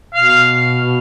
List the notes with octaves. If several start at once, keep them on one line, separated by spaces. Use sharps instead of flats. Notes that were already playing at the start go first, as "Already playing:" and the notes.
B2 F5